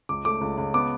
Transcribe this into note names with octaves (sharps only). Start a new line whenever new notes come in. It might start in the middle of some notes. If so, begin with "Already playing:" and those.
C#2 D6
A3 D6
C#2
C#2
B3 D6